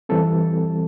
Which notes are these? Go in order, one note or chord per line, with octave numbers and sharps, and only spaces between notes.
E3 G3 C4 A4